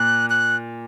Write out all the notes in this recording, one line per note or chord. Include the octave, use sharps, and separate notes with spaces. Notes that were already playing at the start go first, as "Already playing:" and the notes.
Already playing: A#2 F#6
F#6